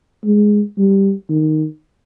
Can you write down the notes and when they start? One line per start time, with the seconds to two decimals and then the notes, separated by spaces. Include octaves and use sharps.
0.25 G#3
0.78 G3
1.30 D#3